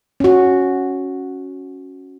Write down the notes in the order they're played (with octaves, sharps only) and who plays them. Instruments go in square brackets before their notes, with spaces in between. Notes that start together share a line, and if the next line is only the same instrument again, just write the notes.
[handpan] C#4 F#4